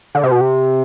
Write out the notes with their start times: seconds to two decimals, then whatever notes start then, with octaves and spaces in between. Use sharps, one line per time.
0.15 D3
0.23 C3
0.32 B2
0.41 C3